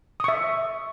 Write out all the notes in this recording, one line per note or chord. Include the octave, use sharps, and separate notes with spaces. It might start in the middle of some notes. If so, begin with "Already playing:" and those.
E5 C#6 D#6